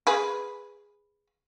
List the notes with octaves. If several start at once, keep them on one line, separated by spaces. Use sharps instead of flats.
G#4 B4